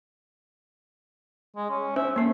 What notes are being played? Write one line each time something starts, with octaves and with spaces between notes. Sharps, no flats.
G#3
C#4
C#4 C5 E5
A3 A#3 C7